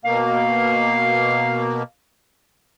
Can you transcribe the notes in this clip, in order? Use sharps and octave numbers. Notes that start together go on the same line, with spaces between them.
B2 A#3 F5